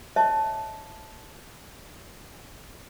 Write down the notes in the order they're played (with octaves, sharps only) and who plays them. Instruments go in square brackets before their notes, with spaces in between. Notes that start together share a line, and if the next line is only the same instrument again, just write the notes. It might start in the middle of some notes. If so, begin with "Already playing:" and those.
[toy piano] C#5 D#5 E5 A5